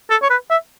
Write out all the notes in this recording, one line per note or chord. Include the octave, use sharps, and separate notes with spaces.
A4
C#5
B4
E5